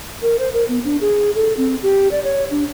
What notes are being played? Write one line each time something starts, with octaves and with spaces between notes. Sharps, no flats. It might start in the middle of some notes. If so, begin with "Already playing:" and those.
A#4
C5
A#4
B3
D4
G#4
A4
C4
G4
D5
C#5
D4